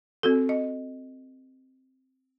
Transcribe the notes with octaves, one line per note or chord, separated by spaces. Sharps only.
C4 F#4 A4
D#5